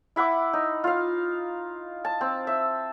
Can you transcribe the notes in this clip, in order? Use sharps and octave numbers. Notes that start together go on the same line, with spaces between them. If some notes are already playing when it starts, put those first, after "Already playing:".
E4 E5 F#5 D6
D#4
F4 F5
A5
C4
E5